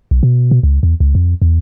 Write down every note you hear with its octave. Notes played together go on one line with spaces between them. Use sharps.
B1
B2
B2
C#2
E2
C#2
F2
E2